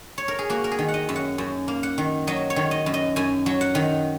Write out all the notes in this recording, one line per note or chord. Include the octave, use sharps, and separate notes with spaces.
C#5
A#4
G#4
A#3 F#4
A#4
G#4
D#3
F#5
D#5
F#2
F#5
F#2
A#3
F#5
D#3
F#3 D#5
C#5
D#3
D#5
F#2
D#5
F#2 G#5
F#3
F#5
D#3